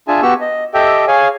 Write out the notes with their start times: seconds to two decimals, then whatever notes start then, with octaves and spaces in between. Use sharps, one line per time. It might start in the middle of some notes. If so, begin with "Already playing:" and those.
0.08 D4 F4 G#4 E5 G#5 A5
0.22 B3 F#4 G4 C#6 E6
0.41 D#5
0.74 G4 A4 D#5 E5 G5
1.08 G#4 C#5 F5 G#5